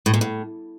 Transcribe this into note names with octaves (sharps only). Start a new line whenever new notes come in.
A2
A#2
A2